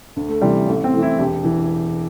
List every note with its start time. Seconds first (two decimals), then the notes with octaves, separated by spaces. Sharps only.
0.16 D2
0.29 A3
0.41 C3 E3 G3
0.67 A1 A3
0.84 C4
0.93 A2 E3
1.02 E4
1.18 E1 G4
1.44 E3